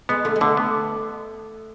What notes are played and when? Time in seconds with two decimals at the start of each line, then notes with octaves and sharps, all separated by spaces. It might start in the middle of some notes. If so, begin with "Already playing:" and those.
0.09 G#3 B3
0.25 D3 A3
0.36 G#3
0.41 D3 A3
0.57 B3